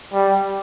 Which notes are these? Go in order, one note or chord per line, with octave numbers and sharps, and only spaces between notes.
G3